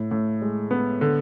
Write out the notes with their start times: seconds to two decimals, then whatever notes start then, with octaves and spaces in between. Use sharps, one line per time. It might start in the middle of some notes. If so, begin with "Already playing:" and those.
Already playing: A2
0.11 A2
0.42 G#3
0.71 B3
1.01 D3